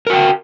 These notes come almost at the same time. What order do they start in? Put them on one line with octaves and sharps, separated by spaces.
A#4 F#4 G5